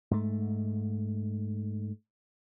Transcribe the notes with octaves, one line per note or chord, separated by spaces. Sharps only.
G#2 A3